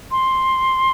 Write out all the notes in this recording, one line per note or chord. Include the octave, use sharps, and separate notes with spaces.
C6